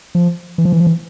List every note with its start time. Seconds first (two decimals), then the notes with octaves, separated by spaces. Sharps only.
0.15 F3
0.58 E3
0.65 F3
0.72 E3
0.80 F3
0.87 E3